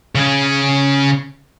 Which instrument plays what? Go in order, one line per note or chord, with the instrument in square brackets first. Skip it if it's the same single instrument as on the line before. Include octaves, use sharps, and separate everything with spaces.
[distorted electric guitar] C#3 C#4